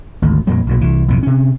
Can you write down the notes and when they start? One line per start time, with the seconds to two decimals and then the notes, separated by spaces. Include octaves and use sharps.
0.22 G#1 D2
0.47 F2 A#2 F#3 G3
0.67 B1 A#2 F#3
0.81 C2 E3
1.08 B1 F2 A2 C3
1.23 C3 C#4